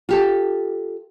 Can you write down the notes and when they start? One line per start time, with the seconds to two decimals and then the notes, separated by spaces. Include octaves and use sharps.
0.09 F4 G4 A4